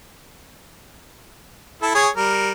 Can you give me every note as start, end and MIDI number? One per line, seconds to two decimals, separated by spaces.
1.82 1.93 64
1.82 1.93 69
1.95 2.08 68
1.95 2.08 73
2.16 2.52 55
2.16 2.52 70